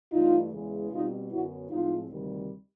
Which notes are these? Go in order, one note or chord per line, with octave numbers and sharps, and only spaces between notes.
G2 E3 A3 D#4 F4
E2 C#3 E3 G#3
B2 G3 C4 D#4 F4
F#2 D3 F#3 B3 E4 F#4
A2 F3 G#3 C4 D#4 F4
D2 C3 D#3 G3